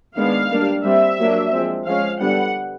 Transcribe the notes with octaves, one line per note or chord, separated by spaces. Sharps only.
D#3 G#3 B3 D4 F5
G3 A#3 D4
G3 C4 E5
F#3 A#3 D4
F3 G#3 C4
F3 G#3 C#4 F5
D3 G3 B3 D4 F#5